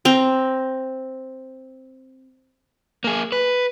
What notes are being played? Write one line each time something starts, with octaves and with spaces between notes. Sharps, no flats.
C4 A#5
A#3 G#4
B4